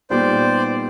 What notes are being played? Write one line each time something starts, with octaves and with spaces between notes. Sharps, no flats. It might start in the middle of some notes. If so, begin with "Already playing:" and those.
A#2 G3 B3 D#4 G4 C5 D5